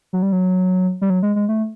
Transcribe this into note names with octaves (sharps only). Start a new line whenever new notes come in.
F#3
G3
F#3
G3
F#3
G#3
G#3
A3